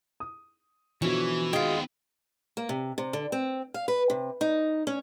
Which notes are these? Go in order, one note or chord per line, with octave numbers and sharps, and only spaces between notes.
D#6
B2 D3 E3 F3 C#4 F#4
D#3 G#3 B3 C4 F4 G5
A#3
C3
C3
D3
C4
F5
B4
C3
D#4
C#4